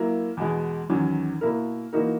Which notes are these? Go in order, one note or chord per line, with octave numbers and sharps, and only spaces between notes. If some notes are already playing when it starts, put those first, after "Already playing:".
Already playing: F#3 A#3 E4 A#4
E2 B2 G#3
E2 D#3 F#3 C#4
B2 A#3 E4 A#4
E3 A#3 D#4 F#4 A#4